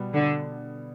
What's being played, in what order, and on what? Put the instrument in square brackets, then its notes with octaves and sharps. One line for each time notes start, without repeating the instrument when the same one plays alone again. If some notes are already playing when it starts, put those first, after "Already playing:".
Already playing: [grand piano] B2 G3 B3
[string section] D3